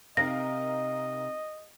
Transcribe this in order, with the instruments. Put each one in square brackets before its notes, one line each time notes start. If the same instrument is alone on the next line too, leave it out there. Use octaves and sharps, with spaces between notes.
[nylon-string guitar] C3 [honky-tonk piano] D#4 A#4 F5 [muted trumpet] D#5 [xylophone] A#6